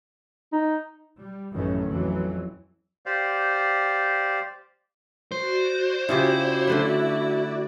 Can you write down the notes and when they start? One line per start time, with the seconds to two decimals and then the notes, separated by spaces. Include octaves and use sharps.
0.52 D#4
1.19 G3
1.53 A1 F#2 A2 D#3 E3 C#4
1.88 F2 E3 F#3
3.06 G4 C5 D5 F5
5.32 F#4 C5 D5
6.09 C#3 E4 F4 G4
6.67 D3 A3 B4